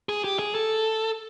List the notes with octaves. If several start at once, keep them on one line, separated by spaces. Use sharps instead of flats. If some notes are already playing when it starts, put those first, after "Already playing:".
G#4
G4
G#4
A4